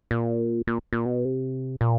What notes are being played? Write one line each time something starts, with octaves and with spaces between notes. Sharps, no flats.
A#2
A#2
A#2
B2
C3
A#2